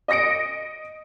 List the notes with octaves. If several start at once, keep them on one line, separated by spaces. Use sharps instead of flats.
D#5 D#6 A#6 C#7 D7